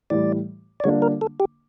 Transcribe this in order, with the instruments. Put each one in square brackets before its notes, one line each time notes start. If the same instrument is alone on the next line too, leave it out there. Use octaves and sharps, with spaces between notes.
[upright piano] A2 E3 G3 [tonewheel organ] D5
[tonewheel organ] D5
[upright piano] D3 G3 A#3 D4 F4 [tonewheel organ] C#5
[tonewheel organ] A#4
A4
G4